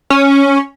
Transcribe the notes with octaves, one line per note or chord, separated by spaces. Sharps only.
C#4